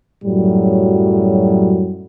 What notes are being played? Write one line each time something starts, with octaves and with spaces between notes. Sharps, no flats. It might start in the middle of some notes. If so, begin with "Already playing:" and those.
F#2 A2 F#3 G3